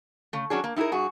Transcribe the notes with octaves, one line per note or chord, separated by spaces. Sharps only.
C#3 A3
F#3 C#4 D4 G#4
A#3
D#4 E4 G4 G#4 A#4
G2 F#4 G#4